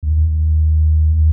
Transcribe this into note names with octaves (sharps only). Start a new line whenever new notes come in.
D#2